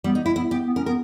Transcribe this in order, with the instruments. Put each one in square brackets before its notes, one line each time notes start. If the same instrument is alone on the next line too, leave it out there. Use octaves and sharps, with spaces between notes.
[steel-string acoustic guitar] G3 [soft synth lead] B3
[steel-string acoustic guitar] D#4
E4
[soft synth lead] B3 [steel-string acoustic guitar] E4
[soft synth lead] B3 [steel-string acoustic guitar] G4
[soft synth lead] B3
[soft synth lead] C#4 [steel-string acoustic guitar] A#4
[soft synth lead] B3 [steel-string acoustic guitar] A#4